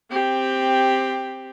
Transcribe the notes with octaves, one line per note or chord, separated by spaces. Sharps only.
C4 G4